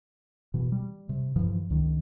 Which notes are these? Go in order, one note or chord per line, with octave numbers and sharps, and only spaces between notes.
B2 E3
G3
C3
G2 E3 F3
C#2 D#3